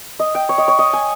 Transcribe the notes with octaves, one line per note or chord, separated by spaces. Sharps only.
D#5
G5
C#5
D#5
C#5
D#5
G#5